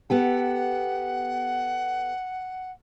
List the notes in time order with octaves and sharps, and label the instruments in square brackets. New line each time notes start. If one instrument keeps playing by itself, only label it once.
[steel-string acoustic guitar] B3 G4 A4 [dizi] F#5